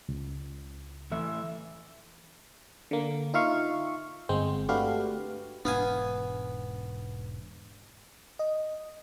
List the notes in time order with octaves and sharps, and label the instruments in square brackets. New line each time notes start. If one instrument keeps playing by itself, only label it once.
[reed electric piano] C#2
[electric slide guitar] A2 E3 E5
[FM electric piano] D3 A#3
D#4 F4 E5 F5 C#6
G1 G#3 C4 C5
A3 D4 F#4 G4 B4 F5
[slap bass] E1 G#2 D4 [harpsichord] B3 F5 G#5
[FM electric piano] D#5